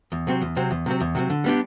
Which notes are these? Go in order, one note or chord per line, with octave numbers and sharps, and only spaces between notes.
E2
C3 F#3 C4
E2
C3 F#3 C4
E2
C3 F#3 C4
E2
C3 F#3 C4
D3
G3 B3 D4 G4